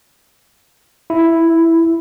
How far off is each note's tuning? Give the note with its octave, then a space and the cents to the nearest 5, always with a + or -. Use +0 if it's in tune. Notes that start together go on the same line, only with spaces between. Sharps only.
E4 +0